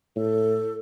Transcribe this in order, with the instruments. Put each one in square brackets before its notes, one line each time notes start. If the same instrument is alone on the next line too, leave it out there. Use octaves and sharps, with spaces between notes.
[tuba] A2 [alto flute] A4